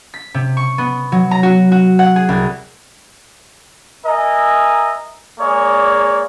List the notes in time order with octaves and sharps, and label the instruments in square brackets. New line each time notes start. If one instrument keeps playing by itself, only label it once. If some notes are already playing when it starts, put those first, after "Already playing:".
[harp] B6
C3
C#6
B3
F#3
A#5
F#4
F#4
F#5
G#4
C2
[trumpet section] A#4 D#5 E5 G#5 A#5
G#3 A#3 G#4 C#5 D5